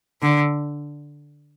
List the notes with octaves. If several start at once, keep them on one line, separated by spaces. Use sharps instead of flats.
D3